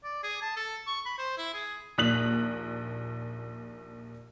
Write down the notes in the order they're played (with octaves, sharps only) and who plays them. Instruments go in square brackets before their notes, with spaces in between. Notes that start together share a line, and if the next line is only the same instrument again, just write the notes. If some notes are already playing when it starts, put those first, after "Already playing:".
[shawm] D5
G#4
A5
A4
C#6
B5
C5
E4
G#4
[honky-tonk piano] A#1 D#2 D#6 F#6 B6 F#7